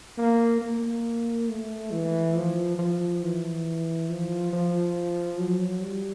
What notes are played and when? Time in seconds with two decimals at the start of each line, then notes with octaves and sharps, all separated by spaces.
0.18 A#3
0.62 A#3
1.49 A3
1.92 E3
2.36 F3
2.79 F3
3.22 E3
4.10 F3
4.53 F3
5.40 F#3
5.83 G3